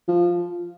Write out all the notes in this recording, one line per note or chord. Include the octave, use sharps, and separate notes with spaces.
F3